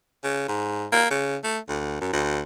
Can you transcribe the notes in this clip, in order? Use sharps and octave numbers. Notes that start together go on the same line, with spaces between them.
C#3
G#2
A#3
C#3
A3
D2
F#2
D2